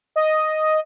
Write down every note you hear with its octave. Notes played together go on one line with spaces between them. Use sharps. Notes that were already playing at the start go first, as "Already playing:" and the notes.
D#5